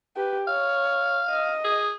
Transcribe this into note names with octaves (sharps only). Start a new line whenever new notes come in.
G4 B4
C#5 F5
D#5
G#4